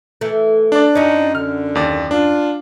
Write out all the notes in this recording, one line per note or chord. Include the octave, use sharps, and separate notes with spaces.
E3 A3
D4 D5
F#2 C#4 D#4
D3 F6
D#2 D5
D4 F4